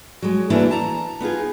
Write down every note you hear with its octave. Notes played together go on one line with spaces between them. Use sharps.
F#3 G#3
E3 A3 A#3 D4 E4 F#4
A5 A#5
B3 D#4 F4 G#4